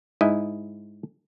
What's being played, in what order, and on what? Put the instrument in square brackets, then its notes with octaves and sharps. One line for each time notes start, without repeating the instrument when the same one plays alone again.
[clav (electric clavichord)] G#2 E4 D#5